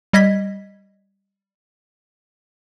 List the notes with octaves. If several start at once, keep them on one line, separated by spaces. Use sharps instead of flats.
G3 D#5 G#6 B6